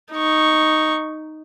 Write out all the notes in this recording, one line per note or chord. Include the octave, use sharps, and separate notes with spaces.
D#4 C#6